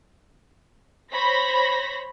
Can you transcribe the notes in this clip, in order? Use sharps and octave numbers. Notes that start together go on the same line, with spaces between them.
C5 C#5 B5 A#6 B6